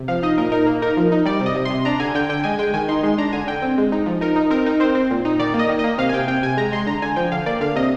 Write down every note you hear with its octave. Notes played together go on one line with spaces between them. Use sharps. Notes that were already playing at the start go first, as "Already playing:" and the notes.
Already playing: C3
F3 F5
D#4 D#5
A#2 A#4
D#4 A#4
A#3
D#4 A#4
F3
D#4
G3 D5
C3
D#5
C3
C3 C6
D4 A#5
D3 G#5
D3 G5
D3 G5
G#3 G#5
G#3 G5
D#3 G#5
D#4 C6
G#3 C6
D4 A#5
D3 G#5
D3 G5
C4
G#3
D#4
F3
D#4 A#4
D#4
C4 A#4
D#4
C4 C5
C4
A#2
D#4
D#3 D5
A#3
D#5
D#3
A#3 D#5
C3 F5
G#5
C3 G5
C4 G5
C3 G#5
G#3 A#5
G#3 C6
D3 A#5
D3 G#5
F3 G5
D3 F5
A#3 D5
D3 F5
C3 D#5